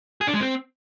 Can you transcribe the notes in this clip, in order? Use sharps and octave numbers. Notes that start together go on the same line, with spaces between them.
G#4
D4
G#3
C4